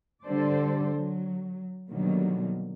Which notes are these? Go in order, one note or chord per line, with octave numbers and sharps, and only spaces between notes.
D3 G3 A4 C5 D5
F#3
B2 D3 D#3 F#3 G3 A#3